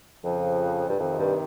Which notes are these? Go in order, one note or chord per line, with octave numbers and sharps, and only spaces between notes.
F2 C#3 F3
G2
F2 C3 D#3
G2